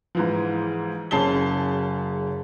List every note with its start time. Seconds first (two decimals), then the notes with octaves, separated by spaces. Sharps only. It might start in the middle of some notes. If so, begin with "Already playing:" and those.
0.15 G#2 E3 F3
1.11 F#1 C#4 G#4 A5 C7 G7